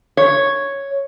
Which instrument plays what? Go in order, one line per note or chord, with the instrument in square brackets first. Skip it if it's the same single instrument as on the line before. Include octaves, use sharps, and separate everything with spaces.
[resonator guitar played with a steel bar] C#5